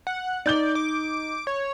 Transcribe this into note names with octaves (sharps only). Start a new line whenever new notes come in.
F#5
D#4 D5 G6 G7
D6
C#5